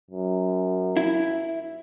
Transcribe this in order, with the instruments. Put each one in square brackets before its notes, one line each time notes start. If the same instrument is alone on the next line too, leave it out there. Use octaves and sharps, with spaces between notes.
[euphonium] F#2
[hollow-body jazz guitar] E4